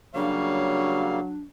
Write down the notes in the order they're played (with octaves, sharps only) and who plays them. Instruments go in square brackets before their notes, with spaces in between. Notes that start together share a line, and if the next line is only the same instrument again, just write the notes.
[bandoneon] C#3 G3 A#3 [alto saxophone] F#3 [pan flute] D4 [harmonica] C#5 F5